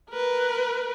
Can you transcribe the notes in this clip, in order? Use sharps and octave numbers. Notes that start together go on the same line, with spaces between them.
A#4 B4